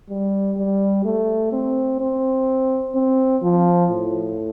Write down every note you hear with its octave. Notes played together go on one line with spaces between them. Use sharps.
G3
G3
A3
C4
C4
C4
F3
A2